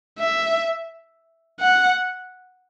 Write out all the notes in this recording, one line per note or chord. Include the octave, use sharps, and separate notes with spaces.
E5
F#5